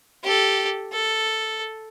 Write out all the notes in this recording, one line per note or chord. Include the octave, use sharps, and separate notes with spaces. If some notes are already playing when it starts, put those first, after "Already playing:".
G4 A4
A4